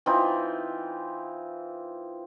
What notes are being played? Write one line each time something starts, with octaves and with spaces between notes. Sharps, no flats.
E3 C4 D#4 F4